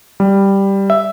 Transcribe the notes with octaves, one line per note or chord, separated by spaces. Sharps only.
G3
E5